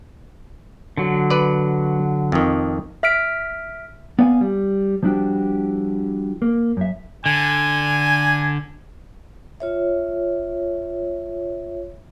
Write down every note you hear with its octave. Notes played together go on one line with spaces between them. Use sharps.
D3 F#3
B4 D5
F2 D#3
E5 F6 B6 D7
B3 D5 F5 G5 G#5
G3
F3 G3 D4 E4 F#4 G4
A#3
F#2 E5
D3 G#5
F4 C#5 E5